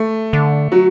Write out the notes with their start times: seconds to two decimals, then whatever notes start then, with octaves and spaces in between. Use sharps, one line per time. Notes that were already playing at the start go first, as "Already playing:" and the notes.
Already playing: A3
0.33 D3
0.72 F#3